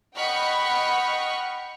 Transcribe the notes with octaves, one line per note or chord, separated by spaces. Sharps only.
D#5 F#5 G5 B5 C#6 F6